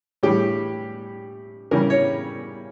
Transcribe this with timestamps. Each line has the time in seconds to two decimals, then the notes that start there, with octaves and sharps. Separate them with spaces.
0.23 A2 E3 G3 G4
1.71 C#3 E3 G3 A#4
1.90 C#5